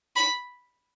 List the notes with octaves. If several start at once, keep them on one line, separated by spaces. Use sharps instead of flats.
B5